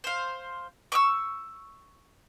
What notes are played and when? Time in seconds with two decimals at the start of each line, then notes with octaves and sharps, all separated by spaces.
0.04 C5 F5
0.92 C#6 D6 E6